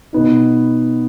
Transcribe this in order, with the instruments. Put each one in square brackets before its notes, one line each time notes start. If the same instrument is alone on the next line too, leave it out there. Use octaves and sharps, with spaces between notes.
[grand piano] B2 B3 D#4